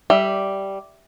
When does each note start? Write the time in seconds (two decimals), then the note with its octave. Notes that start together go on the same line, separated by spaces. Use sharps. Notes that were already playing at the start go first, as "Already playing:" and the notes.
0.10 G3 E5